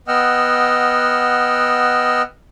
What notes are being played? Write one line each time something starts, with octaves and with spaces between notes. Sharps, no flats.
B3 D#5 F#5 G5 E6 F6